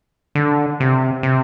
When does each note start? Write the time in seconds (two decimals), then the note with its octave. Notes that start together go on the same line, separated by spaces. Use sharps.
0.35 D3
0.80 C3
1.23 C3